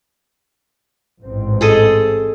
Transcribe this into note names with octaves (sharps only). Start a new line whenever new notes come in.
A1 G#2 C4
G#4 A4 D#5